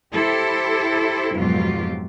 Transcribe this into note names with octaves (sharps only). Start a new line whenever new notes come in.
E4 G4 A4 C5
F2 G#2 B2 F#3 F4 G4